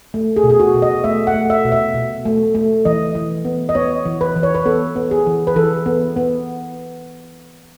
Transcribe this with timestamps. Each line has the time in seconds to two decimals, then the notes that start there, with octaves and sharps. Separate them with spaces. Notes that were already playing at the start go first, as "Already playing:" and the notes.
0.14 A3
0.36 G#4
0.44 B2
0.50 G#4
0.60 F#4
0.74 B2
0.82 D#5
1.04 A3 E5
1.27 F#5
1.34 A3
1.50 E5
1.65 B2
1.72 E5
1.94 B2
2.25 A3
2.55 A3
2.85 E3 D#5
3.15 E3
3.45 B3
3.69 D#5
3.75 B3 C#5
4.05 E3
4.21 B4
4.36 E3
4.43 C#5
4.55 B4
4.66 B3 A4
4.96 B3
5.11 G#4
5.27 E3
5.47 B4
5.56 E3 A4
5.86 B3
6.16 B3